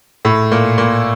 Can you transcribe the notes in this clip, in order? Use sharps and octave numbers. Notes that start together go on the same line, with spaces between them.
A2
A#2
A#2